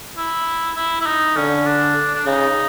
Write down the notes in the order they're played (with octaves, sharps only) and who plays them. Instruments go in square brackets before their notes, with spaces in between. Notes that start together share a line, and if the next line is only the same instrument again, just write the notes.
[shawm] E4
E4
E4
D#4
[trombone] D3 [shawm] C#4
[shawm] D4
D4
[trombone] C#3 [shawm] D#4